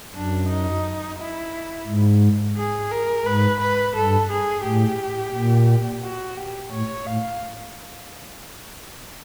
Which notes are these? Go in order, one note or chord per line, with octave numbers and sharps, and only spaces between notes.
F#2 D4
D#4
E4
G#2
G#4
A#4
G#2 B4
B4
G2 A4
G#4
A2 G4
A#2
F#4
G4
A2 C#5
A2 F5